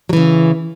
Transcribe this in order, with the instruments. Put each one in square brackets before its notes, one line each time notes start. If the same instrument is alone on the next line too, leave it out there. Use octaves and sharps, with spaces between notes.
[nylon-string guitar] F#3
E3
C#3